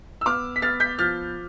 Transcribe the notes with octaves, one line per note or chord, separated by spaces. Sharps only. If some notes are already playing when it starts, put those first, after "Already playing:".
E6
B3 D6 F6
B6
B3 F6 A6
G6 B6
F3 F6 A6